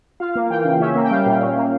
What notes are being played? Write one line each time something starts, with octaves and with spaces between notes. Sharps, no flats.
F4 F5
A#3
E3 G5
C#3
C#4 E5
A#3
G5
G3 F5
A#2
C#4
A#3